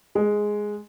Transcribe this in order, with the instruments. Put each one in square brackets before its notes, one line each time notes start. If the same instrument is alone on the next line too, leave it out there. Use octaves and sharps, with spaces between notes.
[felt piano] G#3